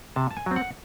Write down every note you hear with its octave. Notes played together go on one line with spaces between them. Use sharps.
C3 A5
A5
G#5
F#3 C4
F#5